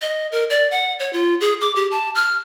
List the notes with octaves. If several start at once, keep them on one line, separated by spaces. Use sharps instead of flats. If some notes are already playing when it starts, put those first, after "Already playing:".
D#5
A#4
D5
F#5
C#5
F4
G#4
D6
G4
A5
F6